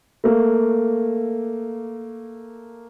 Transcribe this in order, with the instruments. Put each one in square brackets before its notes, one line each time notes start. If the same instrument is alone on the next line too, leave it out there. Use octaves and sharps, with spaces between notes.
[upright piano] A3 A#3